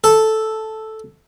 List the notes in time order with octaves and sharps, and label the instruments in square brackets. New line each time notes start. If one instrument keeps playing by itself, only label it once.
[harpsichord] A4